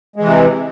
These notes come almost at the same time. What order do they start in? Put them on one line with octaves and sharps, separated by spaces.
G#3 E3 C3